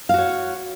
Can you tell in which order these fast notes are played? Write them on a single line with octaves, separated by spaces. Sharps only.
F5 F#4 C#5